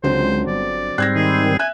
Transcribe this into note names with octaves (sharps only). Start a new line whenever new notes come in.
C#2 D3 F#3 C4 C5
G1 D5
G#2 G3 C4 F#6 G#6 A#6
D#3 G#4
E5 G#5 F#6